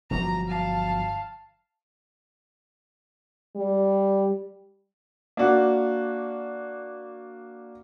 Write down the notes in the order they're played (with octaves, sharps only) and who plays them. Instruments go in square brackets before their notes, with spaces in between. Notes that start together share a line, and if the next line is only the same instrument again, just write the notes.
[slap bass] G1 F3 F#3 [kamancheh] A#5
[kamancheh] F5 A5
[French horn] G3
[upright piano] A#3 D4 F#4